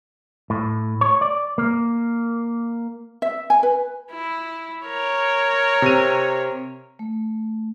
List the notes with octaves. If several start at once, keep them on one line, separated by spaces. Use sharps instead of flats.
A2
C#5
D5
A#3
E5
G#5
B4
E4
A#4 C#5
C3 D#7
A3